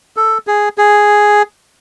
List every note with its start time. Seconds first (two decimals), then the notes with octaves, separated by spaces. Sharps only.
0.17 A4
0.47 G#4
0.78 G#4